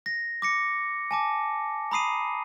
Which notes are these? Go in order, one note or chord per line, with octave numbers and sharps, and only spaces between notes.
A#6
D6 A#6 C#7
G#5 A5 D6
A#5 B5 D#6 C7 D#7